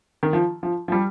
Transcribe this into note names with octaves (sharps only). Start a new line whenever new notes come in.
D#3
F3
F3
F3
G3